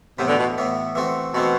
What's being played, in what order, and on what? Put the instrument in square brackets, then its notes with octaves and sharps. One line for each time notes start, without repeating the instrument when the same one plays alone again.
[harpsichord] A2 E3 B3 [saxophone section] C3
[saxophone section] B2 D3
B2
[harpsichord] A2 E3 B3
E3 A3 C4 F#4
[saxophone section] B2 [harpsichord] E3 A3 C4 F#4